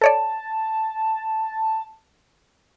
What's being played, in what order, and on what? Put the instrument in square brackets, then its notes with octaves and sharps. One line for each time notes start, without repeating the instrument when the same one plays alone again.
[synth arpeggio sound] A4 C#5 D5 [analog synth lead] A5